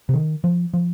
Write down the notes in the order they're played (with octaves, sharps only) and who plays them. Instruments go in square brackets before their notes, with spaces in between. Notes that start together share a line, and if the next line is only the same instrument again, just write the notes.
[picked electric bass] C3
D#3
F3
F3